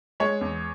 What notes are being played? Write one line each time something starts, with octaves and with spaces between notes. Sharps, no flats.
G#3 C#5
E2